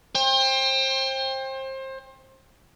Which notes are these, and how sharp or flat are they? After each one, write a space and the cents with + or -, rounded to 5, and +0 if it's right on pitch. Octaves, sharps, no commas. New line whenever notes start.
C5 +30 G5 +25